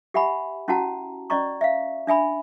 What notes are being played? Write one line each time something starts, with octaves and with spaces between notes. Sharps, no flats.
G4 E5 F#5 G#5 B5
C#4 E4 F#4 F#5 A5 A#5
C#4 D5 D#5 A#5 C#6
E5 F5
D4 E5 G#5 B5